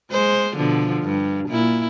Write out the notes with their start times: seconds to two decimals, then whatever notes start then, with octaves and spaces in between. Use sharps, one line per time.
0.11 G#3 C5
0.56 B2 D3 F3
1.04 G2
1.49 A#2 E4